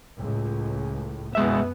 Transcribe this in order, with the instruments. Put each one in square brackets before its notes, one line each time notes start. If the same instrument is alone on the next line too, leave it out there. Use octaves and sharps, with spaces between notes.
[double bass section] C#2 A2
[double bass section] F#2 B3 [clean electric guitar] B2 G#3 E5